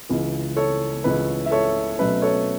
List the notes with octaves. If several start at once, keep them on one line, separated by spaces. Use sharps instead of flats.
C#2 C#3 E3
A4 C#5
C#2 C#3 E3 B4
E5
A4 C#5
B2 F#3 A3 C#4 B4 E5
A4 C#5